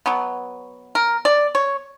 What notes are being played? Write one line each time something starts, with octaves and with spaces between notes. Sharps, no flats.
B2 F#3 B3
A#4
D5
C#5